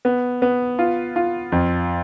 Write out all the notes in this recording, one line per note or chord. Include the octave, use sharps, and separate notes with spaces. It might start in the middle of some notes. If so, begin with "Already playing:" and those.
B3
B3
F4
F4
F2